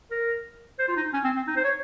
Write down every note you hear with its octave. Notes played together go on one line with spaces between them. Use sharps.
A#4
C5
F4
D#4
C#4
C4
C4
D#4
C5
C#5